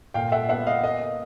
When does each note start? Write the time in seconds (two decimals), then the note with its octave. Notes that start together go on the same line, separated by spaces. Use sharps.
0.14 A#2 F5 G5
0.32 E5 F#5
0.49 B3 E5 F#5
0.67 D#5 F5
0.83 A#3 D#5